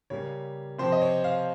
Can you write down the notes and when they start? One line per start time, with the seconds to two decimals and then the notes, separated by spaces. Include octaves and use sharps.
0.10 C#3 G3 A#3 C#4 C#5
0.78 C3 F3 C4 C5
0.92 D#5
1.02 C#5
1.24 F5